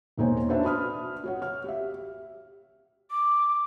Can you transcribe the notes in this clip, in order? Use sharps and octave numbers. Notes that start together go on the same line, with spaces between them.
E1 A#3 D#4 C5 C#5 G#5
D4 F#4 B4 C5 E5 A5
F#4 B5 D#6 F6
F#4 C#5 F#5
F6
G4 E5
D6